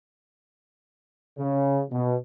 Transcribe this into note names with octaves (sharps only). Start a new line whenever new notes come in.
C#3
B2